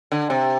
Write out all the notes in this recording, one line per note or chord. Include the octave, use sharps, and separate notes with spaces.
D3
C3